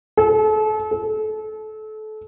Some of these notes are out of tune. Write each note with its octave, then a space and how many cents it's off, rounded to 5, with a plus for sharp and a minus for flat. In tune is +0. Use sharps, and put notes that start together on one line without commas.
A4 -35
A4 -30